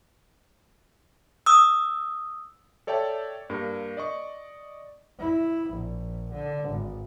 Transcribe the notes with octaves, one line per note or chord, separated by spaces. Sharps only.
D#6 E6
A4 C#5 D5 E5 G5 A5
G2 A#3 A#4
D5 D#5 C#6
E4
A#1
D3
G#1